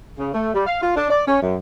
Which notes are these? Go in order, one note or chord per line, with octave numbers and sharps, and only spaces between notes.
C#3
A3
G3
F5
F4
D4
D5
C#4
F#2